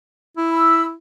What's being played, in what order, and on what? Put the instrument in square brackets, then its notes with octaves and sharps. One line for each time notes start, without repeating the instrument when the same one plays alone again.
[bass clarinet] E4
[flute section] B5 E6